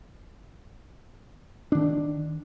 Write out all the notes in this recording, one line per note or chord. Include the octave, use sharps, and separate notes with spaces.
D#3 D4